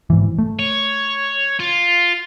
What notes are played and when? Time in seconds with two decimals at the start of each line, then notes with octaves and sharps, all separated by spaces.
0.10 G#2 E3
0.38 A3
0.59 C#5
1.60 F4